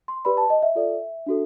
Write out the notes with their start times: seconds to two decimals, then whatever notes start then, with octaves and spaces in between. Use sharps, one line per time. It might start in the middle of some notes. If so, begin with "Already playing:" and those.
0.08 C6
0.25 G4 B4 D5 B5
0.37 A5
0.50 D#5
0.62 E5
0.75 F4 A4 D5
1.26 D4 F#4 A4